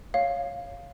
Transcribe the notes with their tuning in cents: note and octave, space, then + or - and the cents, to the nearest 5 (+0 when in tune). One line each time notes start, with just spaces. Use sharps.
C#5 +0 F5 +0